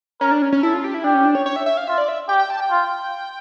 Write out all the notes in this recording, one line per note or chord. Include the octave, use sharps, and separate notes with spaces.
C#4 A#4
D4
C#4
C#4
E4 A4
F4
G4
E4
D4 G4
C#4
D4
C#5
C#5
E5
E5
F5
F4 E5
D5
E5
G4 G5
G5
A5
G5
F4